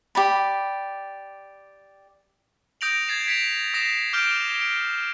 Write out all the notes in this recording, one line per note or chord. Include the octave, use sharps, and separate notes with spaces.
G4 D5 B5
D#6 G6 A#6 D7 F7 F#7
G#6 A6 C7 E7
G#6 B6 C#7 D7 F7
D#6 A#6 C7 E7
D6 F6 G6 D7 F7 G7
D7